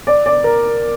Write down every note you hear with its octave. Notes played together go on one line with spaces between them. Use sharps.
D5
D5
A#4